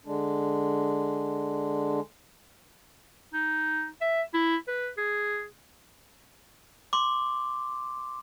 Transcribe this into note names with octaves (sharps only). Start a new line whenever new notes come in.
D3 G#3 D4
D#4
E5
E4
B4
G#4
C6 D6